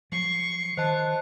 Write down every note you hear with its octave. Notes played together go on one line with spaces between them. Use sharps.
F3 F#3 C#6 C7
D#3 C5 D#5 A5 F#6